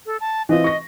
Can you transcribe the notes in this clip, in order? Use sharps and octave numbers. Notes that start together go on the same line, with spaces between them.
A4
A5
E3 C4 F4 D#5
C#6 A#6